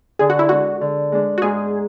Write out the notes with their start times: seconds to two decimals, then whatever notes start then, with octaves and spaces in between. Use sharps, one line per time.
0.19 D3 G#4
0.30 F#4
0.39 E4
0.49 G#3 D4 F#4
0.81 D3
1.12 G#3 D4
1.38 F#4
1.42 G#2 G#4